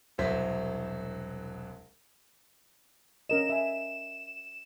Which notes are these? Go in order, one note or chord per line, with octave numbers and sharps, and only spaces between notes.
E1 C2 F#3 C5 B6
C#4 A#4 D#5 E7
E5 G#5